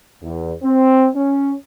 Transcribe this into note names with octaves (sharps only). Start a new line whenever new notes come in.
E2
C4
C#4